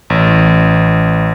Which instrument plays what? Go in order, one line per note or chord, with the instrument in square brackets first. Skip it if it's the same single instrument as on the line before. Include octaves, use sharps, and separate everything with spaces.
[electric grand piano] A1